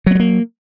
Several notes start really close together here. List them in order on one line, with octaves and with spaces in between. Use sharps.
F#3 B3 G3 A#3